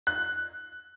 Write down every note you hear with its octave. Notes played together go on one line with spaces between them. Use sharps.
F#6